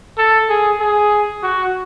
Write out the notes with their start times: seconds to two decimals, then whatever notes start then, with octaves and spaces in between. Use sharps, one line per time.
0.18 A4
0.49 G#4
0.80 G#4
1.43 F#4